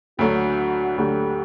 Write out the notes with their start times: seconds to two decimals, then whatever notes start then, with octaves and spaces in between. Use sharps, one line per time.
0.19 D2 D3 F#3 A3 F#4
0.98 D2 D3 F#3 A3 G4